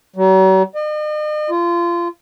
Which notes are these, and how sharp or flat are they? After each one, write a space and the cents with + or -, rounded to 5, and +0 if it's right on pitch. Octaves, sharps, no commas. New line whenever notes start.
F#3 +45
D#5 -45
F4 -25